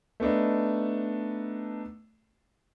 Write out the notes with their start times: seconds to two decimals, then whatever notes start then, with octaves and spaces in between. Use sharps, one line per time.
0.20 A3 B3 D4 D#4